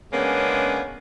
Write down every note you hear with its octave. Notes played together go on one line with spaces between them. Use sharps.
C#3 G#3 A#3 B3 C#4 D4